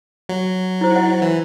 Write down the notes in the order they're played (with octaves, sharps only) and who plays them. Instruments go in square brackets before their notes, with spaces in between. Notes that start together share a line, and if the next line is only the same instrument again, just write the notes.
[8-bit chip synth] F#3
[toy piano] E4 C5
E4 D#5 F#5
[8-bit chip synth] E3